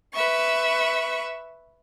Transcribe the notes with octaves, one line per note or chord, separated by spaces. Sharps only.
B4 E5 C#6